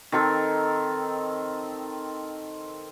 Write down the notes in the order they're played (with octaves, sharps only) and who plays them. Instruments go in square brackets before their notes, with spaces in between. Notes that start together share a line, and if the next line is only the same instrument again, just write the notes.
[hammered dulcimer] D#3 C4 A4 A#4